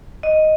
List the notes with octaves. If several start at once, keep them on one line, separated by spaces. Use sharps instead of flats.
D#5